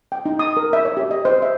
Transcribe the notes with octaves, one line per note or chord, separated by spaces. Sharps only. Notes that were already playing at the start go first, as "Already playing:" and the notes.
G5
D#4
D#6
A#4
E5
C#5
G4
D#5
C5
E5